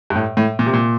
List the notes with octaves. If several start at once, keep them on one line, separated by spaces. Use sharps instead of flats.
G2
A2
A2
A#2
C3
A#2